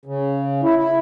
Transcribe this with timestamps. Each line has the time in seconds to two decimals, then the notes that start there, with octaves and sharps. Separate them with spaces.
0.05 C#3
0.63 E4
0.76 E4